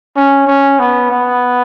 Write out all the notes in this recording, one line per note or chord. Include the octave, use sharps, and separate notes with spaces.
C#4
C#4
B3
B3